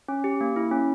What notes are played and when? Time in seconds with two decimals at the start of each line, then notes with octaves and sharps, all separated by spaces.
0.09 C#4
0.24 G4
0.41 A#3
0.56 E4
0.71 C#4